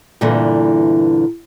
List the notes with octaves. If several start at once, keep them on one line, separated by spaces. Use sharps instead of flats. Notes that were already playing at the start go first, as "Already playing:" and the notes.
E2 G2 A#2 D3 E3